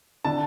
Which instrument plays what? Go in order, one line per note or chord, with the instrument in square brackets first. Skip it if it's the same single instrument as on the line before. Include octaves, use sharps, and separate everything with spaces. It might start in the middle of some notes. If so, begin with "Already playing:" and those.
[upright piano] D3 A5